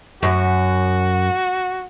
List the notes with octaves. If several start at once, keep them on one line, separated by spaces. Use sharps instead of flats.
F#2 F#4